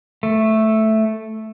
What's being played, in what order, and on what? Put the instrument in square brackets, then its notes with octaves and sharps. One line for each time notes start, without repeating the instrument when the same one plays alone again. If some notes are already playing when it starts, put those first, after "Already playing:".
[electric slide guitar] A3